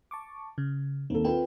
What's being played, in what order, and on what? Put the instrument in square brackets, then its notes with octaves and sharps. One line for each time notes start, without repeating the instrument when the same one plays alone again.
[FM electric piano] A5 C#6 D6
C#3
[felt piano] D#2 A4 [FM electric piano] C4
[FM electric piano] C4 A4 [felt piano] F4 B4 G5